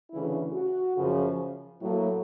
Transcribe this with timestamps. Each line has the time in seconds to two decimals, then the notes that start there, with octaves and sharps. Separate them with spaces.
0.11 D2 C#3 E3 E4
0.53 F#4
0.96 F#2 C#3 F3
1.80 A2 F#3 A#3